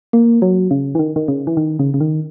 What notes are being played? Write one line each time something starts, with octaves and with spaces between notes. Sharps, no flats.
A#3
F#3
C#3
E3
D#3
D#3
C#3
E3
D#3
C#3
C#3
D#3